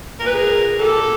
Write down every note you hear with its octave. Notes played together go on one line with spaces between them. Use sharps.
A#2 A#4
B4
G#4 A#4
A#2
A#2 G4 A4